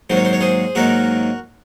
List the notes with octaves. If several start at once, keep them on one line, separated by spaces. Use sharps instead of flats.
G#2 D#3 F#3 A#3 C5
C#5
C5
C#5
G#4 C5
G#2 D#3 F#3 A#3 F#4 A#4